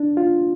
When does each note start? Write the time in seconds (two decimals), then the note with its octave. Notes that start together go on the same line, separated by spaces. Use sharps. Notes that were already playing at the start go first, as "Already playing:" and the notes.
Already playing: D4
0.17 F4